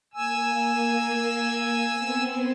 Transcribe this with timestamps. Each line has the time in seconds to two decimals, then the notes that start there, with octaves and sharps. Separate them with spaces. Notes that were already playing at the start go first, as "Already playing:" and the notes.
0.14 A#3 G#5 E6
1.89 B3 C4